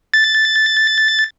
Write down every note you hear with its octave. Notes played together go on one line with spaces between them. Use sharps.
A6